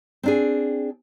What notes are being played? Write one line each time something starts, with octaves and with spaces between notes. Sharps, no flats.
C4 D4 G#4